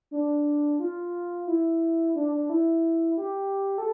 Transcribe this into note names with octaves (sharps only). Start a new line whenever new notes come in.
D4
F4
E4
D4
D4
E4
G4
A4